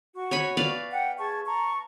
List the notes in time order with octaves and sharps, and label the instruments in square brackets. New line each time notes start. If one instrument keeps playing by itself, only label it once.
[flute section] F#4 C#6
[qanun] C#5 G#5 B5
B4 D5 F5
[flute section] F#5 G5
G#4 A5 C#6
A5 A#5 C#6